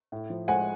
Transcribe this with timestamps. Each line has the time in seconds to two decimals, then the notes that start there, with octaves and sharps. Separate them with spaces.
0.12 A2
0.30 F3
0.48 G#3 F#5 G#5